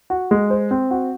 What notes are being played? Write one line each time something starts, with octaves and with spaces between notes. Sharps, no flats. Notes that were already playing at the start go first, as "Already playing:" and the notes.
F#4
G#3
C5
C4
F#4